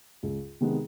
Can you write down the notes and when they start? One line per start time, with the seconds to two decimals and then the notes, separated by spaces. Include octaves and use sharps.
0.23 C#2
0.61 C3 D#3 G#3 B3